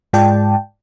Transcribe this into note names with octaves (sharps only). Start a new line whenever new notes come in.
G#2 G#3 F4 D5 G5 A5